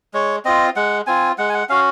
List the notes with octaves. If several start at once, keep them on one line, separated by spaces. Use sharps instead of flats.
G#3 C#5
C4 F4 D#5
G#3 F#5
C4 F4 G#5
G#3 F#5
G#5
F#5
C#4 F#4 F5